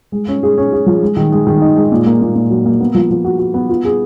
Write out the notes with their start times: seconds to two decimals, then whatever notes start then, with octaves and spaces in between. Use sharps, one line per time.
0.12 G#3
0.28 C#4
0.43 G#4
0.58 C#4
0.73 G#4
0.86 F3
1.02 G#3
1.17 D#3
1.32 G#3
1.47 D#3
1.62 D#4
1.76 G#3
1.92 A#2
2.06 A#3
2.21 A#2
2.35 A#2
2.50 F#3
2.66 A#3
2.81 B3
2.95 F3
3.11 F3
3.25 F#4
3.39 F#4
3.54 B3
3.69 F4
3.85 G#4